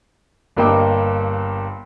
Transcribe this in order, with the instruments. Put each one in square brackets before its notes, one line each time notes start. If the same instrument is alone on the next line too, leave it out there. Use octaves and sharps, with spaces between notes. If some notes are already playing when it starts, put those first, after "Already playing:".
[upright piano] G1 G2 A#3 D#5 G5 D6